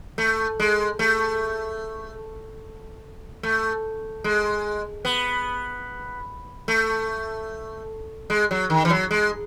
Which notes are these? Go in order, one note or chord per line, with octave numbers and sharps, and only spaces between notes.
A3
G#3
A3
A3
G#3
B3
A3
G#3
F#3
D#3
E3
F#3
G#3